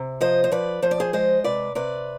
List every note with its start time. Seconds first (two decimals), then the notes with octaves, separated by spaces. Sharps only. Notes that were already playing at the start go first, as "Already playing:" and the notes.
Already playing: C3
0.21 F3 C5 D#5
0.44 C5
0.52 F3 B4 D5
0.82 F3 C5
0.91 D5
1.00 G#4 C5
1.13 G#3 C5 D#5
1.44 C3 B4 D5
1.75 C3 B4 D5